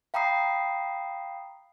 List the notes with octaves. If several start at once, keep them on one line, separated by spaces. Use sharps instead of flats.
F5 G5 A#5 B5 D#6 C7